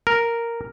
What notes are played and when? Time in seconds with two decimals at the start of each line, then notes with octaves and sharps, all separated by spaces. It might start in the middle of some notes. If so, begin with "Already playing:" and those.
0.07 A#4